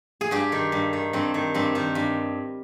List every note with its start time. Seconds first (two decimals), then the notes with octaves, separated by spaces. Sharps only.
0.21 G#4
0.31 G2 G4
0.52 D#3
0.72 G2
0.93 D#3
1.13 G2 C4
1.34 D#3
1.54 G2 C4
1.75 D#3
1.95 G2